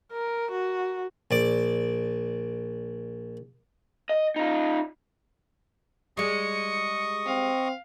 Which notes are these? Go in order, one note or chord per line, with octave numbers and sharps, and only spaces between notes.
A#4
F#4
A#1 D5 D6
D#5
D#4 F4
G3 G#3 D#5 C#6 D#6 C#7
C4 F5